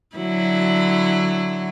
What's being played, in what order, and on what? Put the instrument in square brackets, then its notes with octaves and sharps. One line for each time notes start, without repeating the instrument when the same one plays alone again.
[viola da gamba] D3 F#3 E4